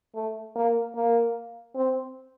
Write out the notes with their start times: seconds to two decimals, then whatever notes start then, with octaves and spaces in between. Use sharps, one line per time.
0.15 A3
0.56 A#3
0.95 A#3
1.75 C4